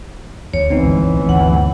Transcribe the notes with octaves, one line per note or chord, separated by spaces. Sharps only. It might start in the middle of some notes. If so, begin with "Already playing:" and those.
D2 C#5
E3 B3 C4 D#4
G1 C#2 F#2
A1
D2 G2 A#2 F#5